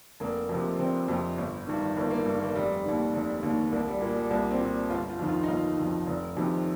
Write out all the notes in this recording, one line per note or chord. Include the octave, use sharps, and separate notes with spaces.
F1 A#3
F2 C3
F1 C4
F2 C3
G1
G2 D#3
G1 A#3
A#3
G2 D#3
A#3
F1 G3
D#2 D#3
F1
D#2 D#3
C2 A#3
G3
A#2 A#3
G3
C2 A#3
C4
A#2
G1 F4
F4
F2 D#3
F4
D#4
G1 F4
F2 D#3
F1
F2 C3 D#3